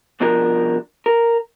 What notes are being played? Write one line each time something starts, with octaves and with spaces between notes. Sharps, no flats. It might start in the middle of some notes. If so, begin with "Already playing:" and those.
C2 B2 F3 D4 A#4
A#4